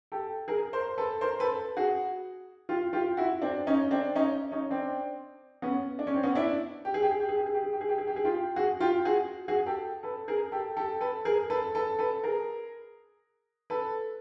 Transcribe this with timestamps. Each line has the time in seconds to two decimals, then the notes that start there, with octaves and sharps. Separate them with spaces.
0.12 G4 A4
0.48 G#4 A#4
0.73 A#4 C5
0.98 A4 B4
1.21 A#4 C5
1.40 A4 B4
1.77 F#4 G#4
2.69 F4 G4
2.93 F4 G4
3.17 E4 F#4
3.42 C4 D4
3.67 C#4 D#4
3.91 C4 D4
4.15 C#4 D#4
4.52 C#4 D#4
4.70 C4 D4
5.62 B3 C#4
5.99 D4
6.07 C#4
6.15 C4
6.23 B3 C#4
6.35 D4 E4
6.85 G4
6.94 G#4
7.02 G4
7.11 G#4
7.20 G4
7.29 G#4
7.37 G4
7.46 G#4
7.54 G4
7.63 G#4
7.73 G4
7.81 G#4
7.89 G4
7.98 G#4
8.07 G4
8.16 G#4
8.25 F4 G4
8.56 F#4 G#4
8.80 F4 G4
9.05 F#4 G#4
9.48 F#4 G#4
9.66 G4 A4
10.03 A4 B4
10.28 G#4 A#4
10.52 G4 A4
10.77 G4 A4
11.01 A4 B4
11.25 G#4 A#4
11.50 A4 B4
11.75 A4 B4
11.99 A4 B4
12.24 G#4 A#4
13.70 A4 B4